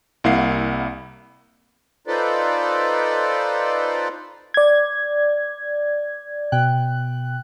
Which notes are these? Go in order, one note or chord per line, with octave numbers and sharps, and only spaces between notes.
C2 A#3 E4 F5 F#5 C7
D#4 F4 A4 B4 C5 D5
D5 G#6
B2 G5 F#6